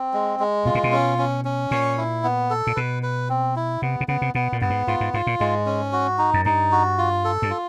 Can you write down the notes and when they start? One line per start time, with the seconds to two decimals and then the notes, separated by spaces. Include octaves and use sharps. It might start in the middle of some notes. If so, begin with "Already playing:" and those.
Already playing: C4
0.13 G#3
0.40 G#3
0.65 B2 F4
0.75 A#2
0.84 B2
0.92 C#4
1.18 C#4
1.45 C#4
1.71 A#2 C#5
1.98 E4
2.24 B3
2.50 A4
2.67 A#2
2.76 B2 B4
3.03 B4
3.29 C4
3.56 E4
3.82 C3 B3
4.01 C3
4.08 C#3 B3
4.22 C3
4.35 B2 B3
4.52 A#2
4.61 G2 B3
4.70 G#2
4.87 G#2 F4
5.01 G#2
5.14 G#2 F4
5.27 A#2
5.40 G#2 G#3
5.66 C#4
5.93 F#4
6.19 D#4
6.34 F#2
6.45 G2 D#4
6.72 F#4
6.98 F4
7.25 A4
7.42 G2
7.50 F4